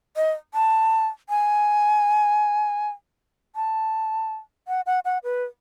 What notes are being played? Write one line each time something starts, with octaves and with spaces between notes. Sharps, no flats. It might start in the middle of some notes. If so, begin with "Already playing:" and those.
D#5
A5
G#5
A5
F#5
F#5
F#5
B4